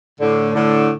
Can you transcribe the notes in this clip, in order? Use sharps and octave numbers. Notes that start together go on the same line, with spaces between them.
A2 D3
A2 D3